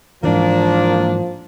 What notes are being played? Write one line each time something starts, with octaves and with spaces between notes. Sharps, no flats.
G#2 E3 F3 A#3 D4